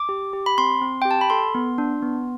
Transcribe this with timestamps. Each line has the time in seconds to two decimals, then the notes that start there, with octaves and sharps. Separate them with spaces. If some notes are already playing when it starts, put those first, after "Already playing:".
Already playing: D6
0.09 G4
0.33 G4
0.46 B5
0.58 C4 C6
0.81 C4
1.02 G4 G5
1.11 A5
1.21 B5
1.30 A4 C6
1.55 B3
1.78 D4
2.02 B3